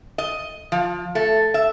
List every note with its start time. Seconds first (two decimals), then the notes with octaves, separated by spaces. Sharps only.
0.18 D#5
0.72 F3
1.15 A3
1.54 E5